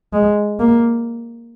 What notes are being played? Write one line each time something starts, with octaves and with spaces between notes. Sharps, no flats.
G#3
A#3